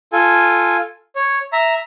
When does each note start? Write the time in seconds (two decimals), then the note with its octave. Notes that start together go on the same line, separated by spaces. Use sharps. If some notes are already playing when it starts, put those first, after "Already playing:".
0.13 F4 A4 G#5
1.16 C#5
1.53 E5 A#5